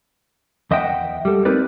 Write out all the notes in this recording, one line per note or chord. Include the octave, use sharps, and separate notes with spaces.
E2 D#5 E5 F#5 G5
G3 A4
C4 D#4 A#4 B4 D5